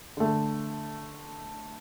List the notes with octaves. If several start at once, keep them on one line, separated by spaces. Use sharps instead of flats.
D3 A3